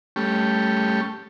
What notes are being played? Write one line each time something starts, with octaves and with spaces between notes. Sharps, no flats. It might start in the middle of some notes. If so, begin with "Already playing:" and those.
G3 A3 C#4 G4